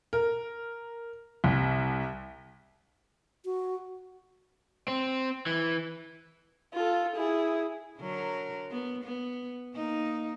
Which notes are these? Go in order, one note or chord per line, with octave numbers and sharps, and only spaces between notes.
A#4
C2
F#4
C4
E3
F4 A4
E4 G#4
D3 F#3 A#4
B3
B3
A#3 D#4